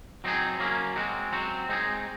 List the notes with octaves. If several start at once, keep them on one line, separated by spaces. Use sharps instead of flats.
F#3 C4 D#4 G#4
F#3 A#3 C#4 G#4
G#3 C4 F#4
F#3 C4 F#4
G#3 C4 D#4 G#4